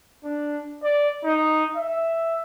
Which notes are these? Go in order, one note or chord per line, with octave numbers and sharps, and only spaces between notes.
D4
D5
D#4
E5